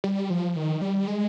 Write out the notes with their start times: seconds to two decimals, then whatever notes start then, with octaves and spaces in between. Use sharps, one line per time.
0.04 G3
0.30 F3
0.56 D#3
0.82 G3
1.07 G#3